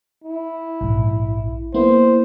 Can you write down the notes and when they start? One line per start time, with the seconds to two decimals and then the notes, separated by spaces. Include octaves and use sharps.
0.24 E4
0.81 A#1 G#2
1.74 A#3 B3 E4 C5